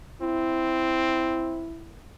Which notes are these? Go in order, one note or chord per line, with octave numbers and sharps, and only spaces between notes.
C4 E4